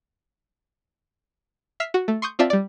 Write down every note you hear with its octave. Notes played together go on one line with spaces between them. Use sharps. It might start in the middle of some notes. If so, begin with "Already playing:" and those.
E5 F6 B6 C7
F#4
A3
C6 C#6 D#6 G6
C4 F4 D5 E5 A5
G3 D5